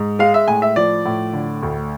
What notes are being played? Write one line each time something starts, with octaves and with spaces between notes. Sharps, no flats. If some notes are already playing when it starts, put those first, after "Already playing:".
Already playing: G#2
G#3 F5
E5
A2 G#5
E5
F3 D5
A2
D3
D2